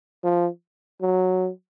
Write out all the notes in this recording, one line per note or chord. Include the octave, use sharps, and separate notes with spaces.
F3
F#3